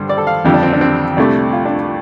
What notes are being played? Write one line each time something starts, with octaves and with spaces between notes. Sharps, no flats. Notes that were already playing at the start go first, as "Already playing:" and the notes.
Already playing: G2 D3 G3 C5
D5
A4
F5
F2 D3 G3 G4
D4
C4
D4
C4
C2 C3 A3 D4
F4
D4